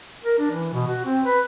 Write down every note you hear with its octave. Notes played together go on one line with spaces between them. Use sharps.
A#4
D4
E3
B2
F#4
C4
B4